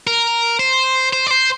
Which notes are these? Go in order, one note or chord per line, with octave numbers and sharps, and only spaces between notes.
A#4
C5
C5
D5
C5